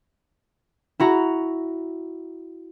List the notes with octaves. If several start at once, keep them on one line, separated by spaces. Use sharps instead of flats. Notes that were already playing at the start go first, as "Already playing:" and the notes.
E4 F#4 A#5